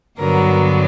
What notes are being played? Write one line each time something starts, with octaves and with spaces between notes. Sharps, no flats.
G2 D3 F#3 B3 A#4